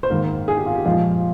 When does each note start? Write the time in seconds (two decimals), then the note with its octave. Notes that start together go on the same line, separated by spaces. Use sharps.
0.03 C5
0.10 G#2 D#3 A#3 A#4
0.48 G#4
0.57 G4
0.66 F4
0.75 G4
0.85 A#2 F3 G#3 F4